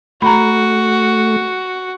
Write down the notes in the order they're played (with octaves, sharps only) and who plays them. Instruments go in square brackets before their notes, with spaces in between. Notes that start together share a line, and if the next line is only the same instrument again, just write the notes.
[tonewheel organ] A3 [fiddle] F#4 [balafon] A#5 B5